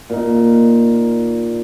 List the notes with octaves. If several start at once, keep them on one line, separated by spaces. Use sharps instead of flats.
A#2 D#4